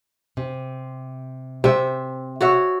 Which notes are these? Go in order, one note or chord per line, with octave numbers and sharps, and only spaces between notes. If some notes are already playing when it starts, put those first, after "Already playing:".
C3
C3 C5 E5
F#4 C#5 E5